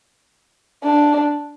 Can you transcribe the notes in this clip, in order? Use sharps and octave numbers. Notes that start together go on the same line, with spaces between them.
D4